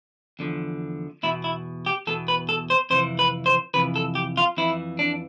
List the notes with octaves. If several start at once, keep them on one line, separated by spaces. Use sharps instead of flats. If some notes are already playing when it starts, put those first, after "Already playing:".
E2 D3 F3
E2 B2 E4
E4
G4
E2 B2 A4
B4
A4
C5
F2 C3 E3 C5
B4
C5
F2 C3 E3 B4
A4
G4
F4
F2 E3 E4
D4